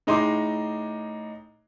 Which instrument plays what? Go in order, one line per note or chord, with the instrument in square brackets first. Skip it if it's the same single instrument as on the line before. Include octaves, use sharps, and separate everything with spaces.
[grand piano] A2 D#4 G#4 C6 D6